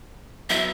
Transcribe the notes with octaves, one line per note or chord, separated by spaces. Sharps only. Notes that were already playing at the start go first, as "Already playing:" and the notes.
F#3 B3 E4 E5